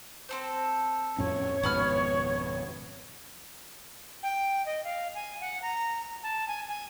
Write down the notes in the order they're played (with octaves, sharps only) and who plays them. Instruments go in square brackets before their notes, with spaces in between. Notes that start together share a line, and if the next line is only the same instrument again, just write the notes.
[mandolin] C4 A4 C5
[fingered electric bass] F2 A2 C#4 [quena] C#5
[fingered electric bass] G#1 F2 B2 [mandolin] B3 B5 F6
[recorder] G5
D#5
F5
G#5
F#5
A#5
A5
G#5
G#5